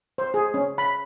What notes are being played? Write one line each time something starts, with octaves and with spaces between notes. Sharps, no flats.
C5
G#4
C#4
B5